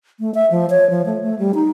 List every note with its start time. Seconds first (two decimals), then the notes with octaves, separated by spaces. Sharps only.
0.20 A3
0.34 E5
0.51 F3
0.70 C#5
0.90 F3
1.06 A3
1.23 A3
1.39 G3
1.55 D#4